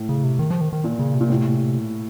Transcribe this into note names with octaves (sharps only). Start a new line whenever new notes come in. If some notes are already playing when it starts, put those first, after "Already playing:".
Already playing: A2
C#3
C3
D#3
F3
D#3
D#3
A#2
C#3
C3
A#2
A2